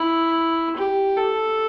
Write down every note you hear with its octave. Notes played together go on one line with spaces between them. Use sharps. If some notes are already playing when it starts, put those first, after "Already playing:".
Already playing: E4
G4
A4